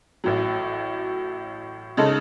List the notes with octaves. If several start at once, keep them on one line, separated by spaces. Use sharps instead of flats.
A1 A2 F#3
C#3 G#3 D#4 A4